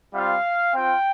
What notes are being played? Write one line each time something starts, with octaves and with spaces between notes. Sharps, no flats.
G3 C4 F4 F5
C4 F4 G5